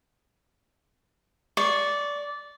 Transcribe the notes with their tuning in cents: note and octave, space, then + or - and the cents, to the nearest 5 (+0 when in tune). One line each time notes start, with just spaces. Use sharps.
D5 -15 C#6 +0